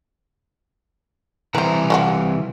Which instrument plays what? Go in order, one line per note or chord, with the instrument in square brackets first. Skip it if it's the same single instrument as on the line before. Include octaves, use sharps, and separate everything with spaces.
[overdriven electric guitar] C2 A#5 [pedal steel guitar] E3 [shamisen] B4 C5
[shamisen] F#3 F4 F#4